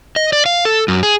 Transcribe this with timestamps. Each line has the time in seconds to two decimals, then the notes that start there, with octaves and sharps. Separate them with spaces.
0.16 D#5
0.33 D5
0.46 F5
0.65 A4
0.88 F#2
1.03 G#4